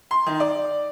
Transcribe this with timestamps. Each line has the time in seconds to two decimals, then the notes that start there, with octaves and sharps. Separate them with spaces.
0.11 C6
0.26 D#3
0.40 D5